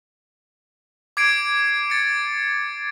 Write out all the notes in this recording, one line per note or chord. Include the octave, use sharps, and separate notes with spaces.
D6 G#6 C7 D7
A6 C#7